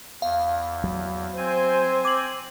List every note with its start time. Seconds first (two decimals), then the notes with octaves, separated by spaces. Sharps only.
0.22 E2 F5
0.84 F#3
1.37 C4 C5 G#5
2.05 D6 F#7